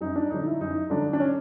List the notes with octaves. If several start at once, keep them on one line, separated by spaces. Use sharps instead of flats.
F#2 D#4
D4
D3 F#3 D#4
E4
F#2 D#4
D3 F#3 D4
D4
C#4